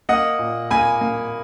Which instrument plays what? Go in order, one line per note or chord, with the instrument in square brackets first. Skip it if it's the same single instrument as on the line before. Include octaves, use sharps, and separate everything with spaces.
[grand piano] A#3 D#5 F#5
A#2
A#3 G#5 B5
A#3